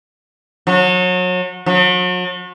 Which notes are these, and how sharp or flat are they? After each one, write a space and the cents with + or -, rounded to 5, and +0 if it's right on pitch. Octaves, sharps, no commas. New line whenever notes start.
F#3 -30
F#3 -40